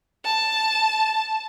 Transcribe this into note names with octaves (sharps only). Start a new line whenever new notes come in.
A5